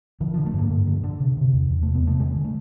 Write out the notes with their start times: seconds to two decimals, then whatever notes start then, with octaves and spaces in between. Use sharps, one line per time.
0.20 D3 F3
0.34 F3
0.38 D3
0.46 A3
0.54 G2 A#3
0.70 G2
0.87 D3
1.03 D3
1.20 C3
1.37 C3
1.53 E2
1.70 E2
1.83 A3
1.87 C3
1.95 B3
2.03 C3 A3
2.19 D3 G#3
2.36 D3
2.44 A3